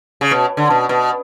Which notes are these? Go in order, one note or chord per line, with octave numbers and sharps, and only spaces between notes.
C#3
B2
D3
B2
B2